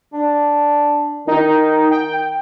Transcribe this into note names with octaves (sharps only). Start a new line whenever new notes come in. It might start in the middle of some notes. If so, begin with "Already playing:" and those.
D4
D#3 D#4
G5